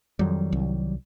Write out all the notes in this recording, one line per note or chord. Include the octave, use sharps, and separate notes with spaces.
F2 D#3 F#3 G3
C2